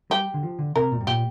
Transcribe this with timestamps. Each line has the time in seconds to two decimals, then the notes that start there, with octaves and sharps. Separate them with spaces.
0.10 G3 G4
0.34 D3
0.43 F3
0.59 D3
0.76 C3 A#4
0.92 A#2
1.01 G2
1.07 A#2 G4